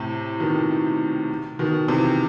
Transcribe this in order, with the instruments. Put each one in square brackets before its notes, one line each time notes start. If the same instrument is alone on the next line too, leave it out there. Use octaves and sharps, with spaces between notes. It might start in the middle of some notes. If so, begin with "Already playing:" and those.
Already playing: [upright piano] A2 C3
B2 D#3
B2 D#3
C3 E3